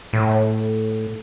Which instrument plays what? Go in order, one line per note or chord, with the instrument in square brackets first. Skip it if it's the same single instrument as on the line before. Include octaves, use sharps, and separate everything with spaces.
[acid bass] A2